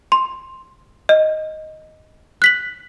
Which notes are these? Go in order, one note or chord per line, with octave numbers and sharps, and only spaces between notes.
C6
D#5
F#6 B6 F#7